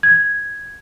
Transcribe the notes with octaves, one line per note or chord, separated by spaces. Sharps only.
G#6